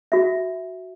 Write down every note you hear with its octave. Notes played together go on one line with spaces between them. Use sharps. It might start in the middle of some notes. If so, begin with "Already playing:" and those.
F#4 E5